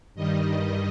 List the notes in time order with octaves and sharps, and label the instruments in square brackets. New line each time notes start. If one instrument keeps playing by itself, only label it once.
[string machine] G2 D#3 G3 D#5